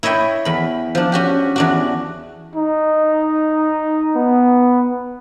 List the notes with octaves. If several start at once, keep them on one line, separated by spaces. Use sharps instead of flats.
E4 C#5 D#5 E5 G5
E2 B5
F3 D4
C#4 F#4 G4
E2 D4 F#4
D#4
B3